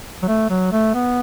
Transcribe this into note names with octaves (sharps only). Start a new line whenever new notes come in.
F#3
A3
F#3
A3
B3